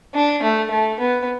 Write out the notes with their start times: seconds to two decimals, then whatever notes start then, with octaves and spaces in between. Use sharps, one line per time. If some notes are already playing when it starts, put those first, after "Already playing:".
0.14 D4
0.43 A3
0.71 A3
1.00 B3